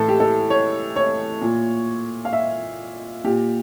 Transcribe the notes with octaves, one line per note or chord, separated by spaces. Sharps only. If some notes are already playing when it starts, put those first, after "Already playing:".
Already playing: A2 E3 A4
G4
A4
C#5
C#5
A#2
F5
E5
A#2 G4